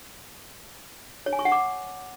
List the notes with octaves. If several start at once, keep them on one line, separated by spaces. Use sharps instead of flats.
C#5
G#5
C#6
F#5
D6